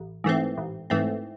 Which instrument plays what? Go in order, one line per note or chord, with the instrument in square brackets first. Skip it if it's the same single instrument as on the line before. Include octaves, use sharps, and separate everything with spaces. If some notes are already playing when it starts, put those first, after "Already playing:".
Already playing: [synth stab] A1
G#2 E3 A3 C4
A1
G#2 E3 A3 C4